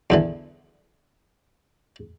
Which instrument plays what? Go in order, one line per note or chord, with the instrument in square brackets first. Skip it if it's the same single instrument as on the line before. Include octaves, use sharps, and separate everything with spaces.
[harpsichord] E2 D3 E3